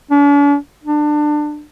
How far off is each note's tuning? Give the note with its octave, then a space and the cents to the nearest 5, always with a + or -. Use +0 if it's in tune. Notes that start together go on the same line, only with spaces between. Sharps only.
D4 -45
D4 +25